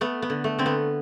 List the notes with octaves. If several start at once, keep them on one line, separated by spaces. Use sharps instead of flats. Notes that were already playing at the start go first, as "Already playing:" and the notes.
A3 B3
B3
D3
A3
D3 C4
B3